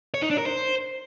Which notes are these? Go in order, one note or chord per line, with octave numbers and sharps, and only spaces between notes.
C#5
D#4
D4
A#4
C5